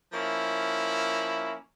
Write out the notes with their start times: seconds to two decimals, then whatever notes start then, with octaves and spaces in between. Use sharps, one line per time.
0.12 F3 A#3 C#4 E4